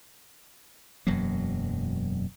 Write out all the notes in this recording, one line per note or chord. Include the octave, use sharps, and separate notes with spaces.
E1 F#2 F#3 A#3